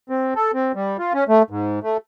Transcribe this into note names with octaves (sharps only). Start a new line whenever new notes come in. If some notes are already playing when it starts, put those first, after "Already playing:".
C4
A4
C4
G3
F4
C#4
A3
G#2
A3